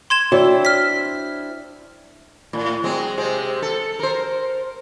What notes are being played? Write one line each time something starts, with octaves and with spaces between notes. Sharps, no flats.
C6 G#6 E7
C4 D4 E4 F#4 C#5
F6 B6
A2
F#3 G#3 C4
C3 G#3 C4
A4
A#4 C5